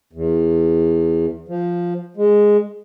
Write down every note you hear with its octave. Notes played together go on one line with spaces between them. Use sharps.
E2
F3
G#3